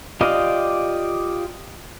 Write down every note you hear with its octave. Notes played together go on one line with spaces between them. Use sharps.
F4 G4 D5 D#5 F5